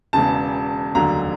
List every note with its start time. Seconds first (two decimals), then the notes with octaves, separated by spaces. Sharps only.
0.13 E1 E2 C#3 A5
0.95 F1 D#2 D3 F#3 A#5